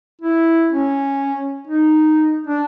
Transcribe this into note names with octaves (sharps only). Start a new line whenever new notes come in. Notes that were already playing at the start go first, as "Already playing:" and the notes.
E4
C#4
D#4
D4